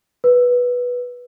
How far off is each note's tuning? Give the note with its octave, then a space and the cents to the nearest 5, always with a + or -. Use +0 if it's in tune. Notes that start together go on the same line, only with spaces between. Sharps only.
B4 -10